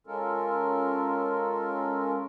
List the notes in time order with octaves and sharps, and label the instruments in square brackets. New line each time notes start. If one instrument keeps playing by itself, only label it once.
[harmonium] G#3 C#4 F4 A4 A#4